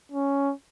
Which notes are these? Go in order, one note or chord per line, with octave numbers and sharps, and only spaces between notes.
C#4